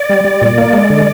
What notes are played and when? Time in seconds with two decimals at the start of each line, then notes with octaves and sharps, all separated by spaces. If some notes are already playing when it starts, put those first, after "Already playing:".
Already playing: D5
0.09 G3
0.24 G3
0.42 A#2
0.58 A#3
0.73 G#3
0.90 D3